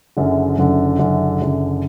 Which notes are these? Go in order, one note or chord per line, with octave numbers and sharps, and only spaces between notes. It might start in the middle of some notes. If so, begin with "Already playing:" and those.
F#1 F#2 D3
F#1 F#2 D3
F#1 F#2 D3
F#1 F#2 D3